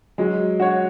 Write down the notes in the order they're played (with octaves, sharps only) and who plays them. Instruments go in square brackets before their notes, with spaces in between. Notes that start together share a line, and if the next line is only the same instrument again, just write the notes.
[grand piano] F#3 [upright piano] G#3
[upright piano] F#4 C#5